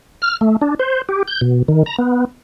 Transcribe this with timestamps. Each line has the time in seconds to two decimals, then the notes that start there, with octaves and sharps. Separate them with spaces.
0.22 F6
0.41 A3
0.61 D4
0.79 C5
1.09 G4
1.28 G6
1.41 B2
1.68 D#3
1.86 A#5
1.99 B3